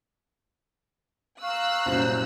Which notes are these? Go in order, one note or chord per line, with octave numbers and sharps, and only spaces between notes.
F5 A#5 C#6 E6 F#6
C2 F#2 A#2 C5